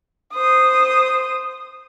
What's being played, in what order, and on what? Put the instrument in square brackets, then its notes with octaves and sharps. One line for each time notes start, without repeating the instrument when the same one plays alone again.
[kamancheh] C5 D#6